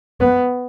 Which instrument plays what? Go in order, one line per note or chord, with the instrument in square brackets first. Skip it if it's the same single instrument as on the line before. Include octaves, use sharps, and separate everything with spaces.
[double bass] B3